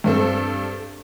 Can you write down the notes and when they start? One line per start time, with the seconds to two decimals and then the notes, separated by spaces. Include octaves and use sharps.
0.04 G2 C4 A4